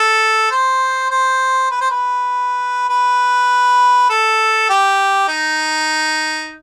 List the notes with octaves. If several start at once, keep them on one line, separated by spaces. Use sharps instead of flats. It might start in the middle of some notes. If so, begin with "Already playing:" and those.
Already playing: A4
C5
C5
B4
C5
B4
B4
A4
G4
D#4